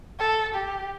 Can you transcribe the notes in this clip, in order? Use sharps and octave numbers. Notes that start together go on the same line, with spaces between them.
A4
G4